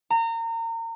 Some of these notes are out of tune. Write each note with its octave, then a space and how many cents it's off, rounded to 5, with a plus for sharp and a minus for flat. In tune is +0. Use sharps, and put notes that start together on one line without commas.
A#5 -30